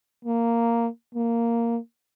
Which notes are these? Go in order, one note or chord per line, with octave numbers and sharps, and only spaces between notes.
A#3
A#3